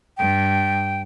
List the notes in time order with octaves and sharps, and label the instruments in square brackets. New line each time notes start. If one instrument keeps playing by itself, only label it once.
[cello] G2 [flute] G5